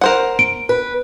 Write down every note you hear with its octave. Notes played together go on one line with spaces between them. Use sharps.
A#4 C5 F#5
D7
B4